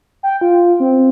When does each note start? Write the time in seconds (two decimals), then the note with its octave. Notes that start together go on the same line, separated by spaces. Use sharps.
0.23 G5
0.41 F4
0.80 C4